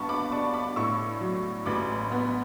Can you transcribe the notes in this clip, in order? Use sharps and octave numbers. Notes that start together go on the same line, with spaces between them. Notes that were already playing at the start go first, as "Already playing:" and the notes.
Already playing: G2 B3 A5 C#6
B5 D6
D4 A5 C#6
B5 D6
A2 C#6 E6
F#3
A1 B5 D6
B3